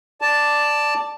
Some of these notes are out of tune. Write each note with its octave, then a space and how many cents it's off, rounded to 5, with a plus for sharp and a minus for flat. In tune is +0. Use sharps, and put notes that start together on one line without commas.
D5 +0 A5 +0